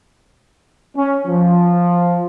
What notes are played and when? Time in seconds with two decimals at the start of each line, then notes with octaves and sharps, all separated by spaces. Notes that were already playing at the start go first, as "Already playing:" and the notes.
0.96 C#4
1.27 F3